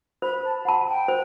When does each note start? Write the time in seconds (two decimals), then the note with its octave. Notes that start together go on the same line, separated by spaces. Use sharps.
0.22 C5 B5
0.44 A5
0.65 F#5 B5
0.69 A5
0.87 G5
1.08 C5